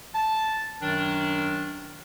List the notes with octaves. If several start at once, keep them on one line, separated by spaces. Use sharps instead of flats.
A5
F#2 D#3 F#3 D4